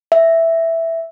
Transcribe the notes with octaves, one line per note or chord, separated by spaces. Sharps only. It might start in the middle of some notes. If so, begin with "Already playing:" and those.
E5